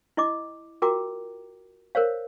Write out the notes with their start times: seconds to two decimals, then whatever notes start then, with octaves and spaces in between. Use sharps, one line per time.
0.17 E4 D#5 D6
0.82 F4 F#4 A#4 G5 A#5 D6
1.95 A#4 C5 C#5 F5